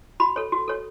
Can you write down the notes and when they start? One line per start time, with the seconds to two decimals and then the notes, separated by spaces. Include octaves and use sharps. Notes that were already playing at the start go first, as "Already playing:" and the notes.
0.20 F#4 B5
0.36 A4 C#5
0.52 F#4
0.68 A4 C#5